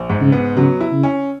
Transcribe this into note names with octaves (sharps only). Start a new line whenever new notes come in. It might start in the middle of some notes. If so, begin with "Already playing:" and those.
Already playing: A#1
G#2
C#3
B3
C#3 F#3
E4
C#3
C#4